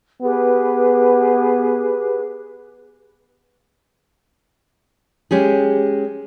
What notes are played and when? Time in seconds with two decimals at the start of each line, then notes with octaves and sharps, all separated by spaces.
0.22 B3 G4 G#4 B4
5.31 G#3 C#4 G4 G#4